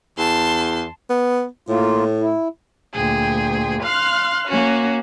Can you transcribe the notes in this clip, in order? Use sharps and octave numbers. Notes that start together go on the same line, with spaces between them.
E2 A5 C6
B3
A2 A#3 F4
E4
D2 A#2 G#4 G5
F5 C6 F6 F#6
A#3 C#4 F#4